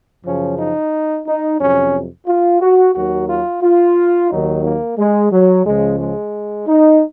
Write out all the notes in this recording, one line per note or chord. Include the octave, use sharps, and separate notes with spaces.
F#2 C#3 F3 C#4
D#4
D#4
F2 C3 F#3 C#4
F4
F#4
D#2 D#3 F#3 F#4
F4
F4
D#2 D#3 F#3 D#4
A#3
G#3
F#3
C#2 C#3 F3 G#3
G#3
D#4